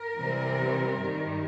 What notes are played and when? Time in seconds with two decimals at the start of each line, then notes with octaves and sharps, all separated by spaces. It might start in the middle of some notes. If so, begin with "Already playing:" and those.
Already playing: A#4
0.18 C3 E3 G3 C4
1.00 G2 D#3 G3